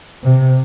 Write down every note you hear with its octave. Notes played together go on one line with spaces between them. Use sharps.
C3